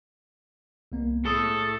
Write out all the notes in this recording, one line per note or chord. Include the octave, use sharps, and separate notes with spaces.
C2 A#3 B3
A2 G#4 A4 D#6